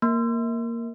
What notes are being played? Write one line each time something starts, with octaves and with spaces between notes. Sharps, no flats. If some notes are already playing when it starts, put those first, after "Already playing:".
A#3